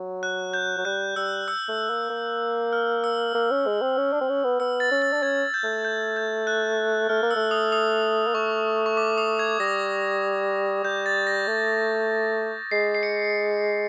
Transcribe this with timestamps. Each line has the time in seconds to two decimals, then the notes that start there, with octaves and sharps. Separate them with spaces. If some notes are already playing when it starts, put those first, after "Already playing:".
Already playing: F#3
0.23 F#6
0.53 G6
0.77 F#3
0.85 G3 F#6
1.16 G3 E6
1.48 E6
1.68 A3
1.89 A#3
2.10 A#3
2.73 F6
3.04 E6
3.34 A#3
3.51 C#4
3.67 G#3
3.82 C4
3.97 C#4
4.13 D4
4.21 C4
4.29 C#4
4.44 B3
4.60 B3 E6
4.80 A6
4.91 C#4
5.02 A6
5.13 D4
5.23 C#4 G#6
5.54 G6
5.64 A3
5.85 G6
6.16 G6
6.47 F#6
7.09 A3 F6
7.23 A#3
7.31 E6
7.36 A3
7.51 D#6
7.72 D#6
8.27 A#3
8.35 A3 C#6
8.86 C#6
8.97 D6
9.18 D#6
9.39 G#6
9.60 G3 A#6
10.84 G3 G6
11.06 A6
11.27 A#6
11.47 A3
12.71 G#3 C7
12.95 C7
13.03 C#7